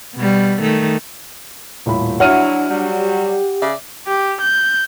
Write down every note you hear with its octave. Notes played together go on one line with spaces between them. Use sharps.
B2 G3
D#3 A3
D#1 A2 B5
F#3 D4 E4 F#4 C#5 F#5 F6 D#7
F#3 G3
G4
C#3 D5 E5
G4
G6